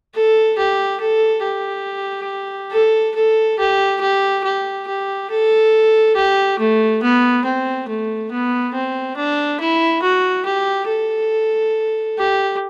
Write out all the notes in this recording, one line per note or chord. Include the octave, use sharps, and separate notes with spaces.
A4
G4
A4
G4
A4
A4
G4
G4
G4
G4
A4
G4
A3
B3
C4
A3
B3
C4
D4
E4
F#4
G4
A4
G4